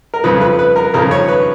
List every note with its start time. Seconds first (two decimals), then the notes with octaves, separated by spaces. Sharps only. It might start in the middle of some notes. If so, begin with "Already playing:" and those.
0.14 A#4
0.24 F2 C#3 F3 B4
0.41 B4
0.59 B4
0.76 A#4
0.94 F2 C#3 F3 A#4
1.11 C#5
1.29 B4